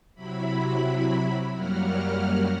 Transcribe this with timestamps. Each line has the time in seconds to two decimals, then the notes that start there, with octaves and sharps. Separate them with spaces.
0.15 C3 F#3 E4 B5
1.54 F#2 F#3 G3 A#3 F#5 F6